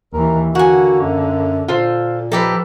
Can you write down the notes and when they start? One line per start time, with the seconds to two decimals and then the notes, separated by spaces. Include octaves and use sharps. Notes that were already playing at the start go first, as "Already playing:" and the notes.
0.13 D#2 E3 A#4
0.55 D3 A#3 F#4 F#5 G#5
1.01 F#2
1.68 A#2 F4 A4 C5
2.32 F3 D#4 G4 A4 B4 B5